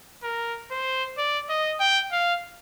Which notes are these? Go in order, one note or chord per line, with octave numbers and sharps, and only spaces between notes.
A#4
C5
D5
D#5
G5
F5